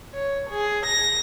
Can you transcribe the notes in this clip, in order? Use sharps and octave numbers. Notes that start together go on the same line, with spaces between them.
C#5
G#4
A#6